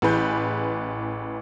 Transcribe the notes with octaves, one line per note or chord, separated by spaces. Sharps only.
A1 E3 G#4 B4 G6